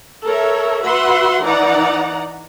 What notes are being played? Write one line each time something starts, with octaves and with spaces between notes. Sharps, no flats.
A4 A#4 C#5 E5
F#4 B4 E5 F#5 C6
E3 D#4 D5 F#5 A#5